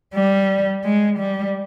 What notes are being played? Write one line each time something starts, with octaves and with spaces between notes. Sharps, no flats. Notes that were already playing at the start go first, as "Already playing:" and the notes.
G3
G#3
G3